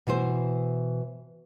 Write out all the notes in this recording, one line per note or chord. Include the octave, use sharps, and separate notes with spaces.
B2 E3 E4 C5